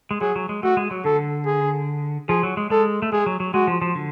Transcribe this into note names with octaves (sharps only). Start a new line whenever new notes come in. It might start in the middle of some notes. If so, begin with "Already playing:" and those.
G#3
F#3 G#4
F#3
G#3
A3 F#4
G#3
F#3
D3 A4
G#4
F3 G#4
F#3
G#3
G#3 A4
A3
G#3 G#4
F#3
F#3
G#3 F#4
F3
F3
D3